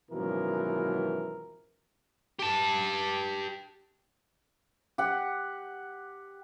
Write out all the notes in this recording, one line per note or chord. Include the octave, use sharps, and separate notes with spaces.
G#1 F#2 B2 E3 F3 A#4
G4 A5
G4 F#5